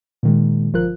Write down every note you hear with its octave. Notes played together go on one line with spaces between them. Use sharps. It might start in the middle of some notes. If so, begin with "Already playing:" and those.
A#2 D#3 G#3
G1 F3 F4 A#4 F#6